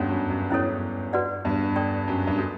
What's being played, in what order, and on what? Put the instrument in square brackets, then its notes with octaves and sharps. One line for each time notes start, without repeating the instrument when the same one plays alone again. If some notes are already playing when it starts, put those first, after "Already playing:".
Already playing: [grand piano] E2 G2 [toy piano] C#4 F#4 A4 C#5 F#5
[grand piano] F#2
F#2
[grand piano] E2 G2 [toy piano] C#4 E4 A4 C#5
[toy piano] F#4 B4 D5 F#5
[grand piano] E2 G2
[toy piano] A4 D5 G5 C#6
[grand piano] F#2
G2
[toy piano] D4 F#4 A4